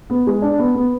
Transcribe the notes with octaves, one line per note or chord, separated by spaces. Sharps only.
B3
G#3
D4
B3
B3